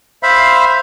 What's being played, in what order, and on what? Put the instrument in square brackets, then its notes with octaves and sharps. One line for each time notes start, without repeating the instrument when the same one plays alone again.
[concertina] C5 E5 F5 B5